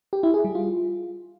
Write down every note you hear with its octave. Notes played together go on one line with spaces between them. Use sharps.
G4
E4
G#4
G3
F4